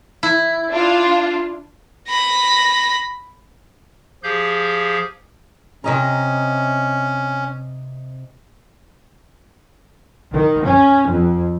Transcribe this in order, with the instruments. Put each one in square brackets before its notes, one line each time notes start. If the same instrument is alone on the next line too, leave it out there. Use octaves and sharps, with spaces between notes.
[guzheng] E4
[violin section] D4 F4
[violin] B5 A#6
[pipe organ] F3 G4 G#4 F5 G6
[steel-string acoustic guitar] C3 D#5 A#5 [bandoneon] C#4
[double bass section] D#3
C#4
F2